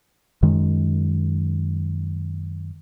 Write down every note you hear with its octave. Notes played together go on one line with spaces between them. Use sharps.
F#2 D#3 G#3